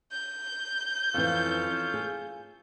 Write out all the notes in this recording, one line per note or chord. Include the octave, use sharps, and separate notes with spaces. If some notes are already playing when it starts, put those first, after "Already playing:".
G6
F2 E3 C#4 F4 A4
G#4